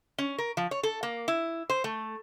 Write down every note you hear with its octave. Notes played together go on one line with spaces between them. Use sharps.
C#4
A#4
F3
C#5
A4
A#3
E4
C5
A3